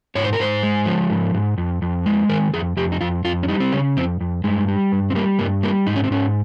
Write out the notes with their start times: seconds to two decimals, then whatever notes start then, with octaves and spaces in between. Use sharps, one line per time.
0.15 G#2 C#5
0.24 C5
0.33 A#4
0.39 G#2 C5
0.63 G#3
0.86 F3
1.10 G#2
1.34 G#2
1.58 F2
1.82 F2
2.06 G#3
2.29 D#3 A#4
2.54 F2 G#4
2.77 F2 G4
2.92 D#4
3.01 F2 F4
3.24 F2 F4
3.43 C#4
3.48 G3 D#4
3.60 C4
3.72 C#3 C#4
3.97 F2 C4
4.21 F2
4.44 G2 G#3
4.68 G3
4.92 G2
5.10 C4
5.15 G3 A#3
5.39 G2 A#3
5.63 G3 A#3
5.86 G#2 D#4
5.95 C#4
6.04 C4
6.11 G#2 C#4